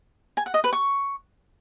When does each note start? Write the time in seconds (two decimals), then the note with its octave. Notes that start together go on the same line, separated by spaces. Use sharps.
0.37 G#5
0.46 F#5
0.54 D#5
0.64 B4
0.73 C#6